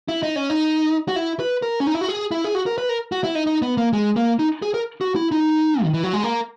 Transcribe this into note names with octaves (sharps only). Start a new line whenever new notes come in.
E4
D#4
C#4
D#4
F#4
E4
B4
A#4
C#4
D#4
E4
F#4
G#4
E4
G#4
F#4
A#4
B4
A#4
F#4
E4
D#4
D#4
B3
A#3
G#3
A#3
D#4
G#4
A#4
F#4
E4
D#4
D#3
E3
F#3
G#3
A#3